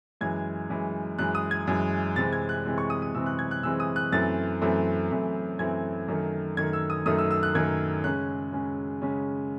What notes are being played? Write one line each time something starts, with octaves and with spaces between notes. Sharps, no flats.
F#2 E3 G#3 G#6
F#2 E3 G#3
F#2 E3 G#3 F#6
D#6
G#6
F#2 E3 G#3
C3 E3 G#3 C4 A6
G#6
F#6
C3 E3 G#3 C4
C#6
D#6
D#6
C3 E3 G#3 C4 E6
F#6
G#6
F#6
C3 E3 G#3 C4 E6
D#6
F#6
F#2 E3 A3 C4 A6
F#2 E3 A3 C4
F#2 E3 A3 C4
F#2 E3 A3 C4 G#6
F#2 D#3 A3
F#2 D#3 A3 G#6
E6
D#6
F#2 D#3 A3 D#6
E6
E6
F#6
F#2 D#3 A3 G#6
C#3 G#3 C#4 F#6
C#3 G#3 C#4
C#3 G#3 C#4